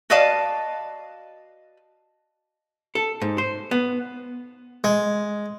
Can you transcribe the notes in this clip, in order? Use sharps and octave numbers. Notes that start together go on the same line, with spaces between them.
F#4 B4 D5 D#5 F5 A5
A4
G#2
C5
B3
G#3